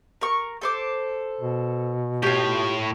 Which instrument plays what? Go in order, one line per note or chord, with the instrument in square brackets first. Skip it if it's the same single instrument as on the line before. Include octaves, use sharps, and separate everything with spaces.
[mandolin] A#4 C#6
A4 C5 D6
[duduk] B2
[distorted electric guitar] A2 C#5 [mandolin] F4 G4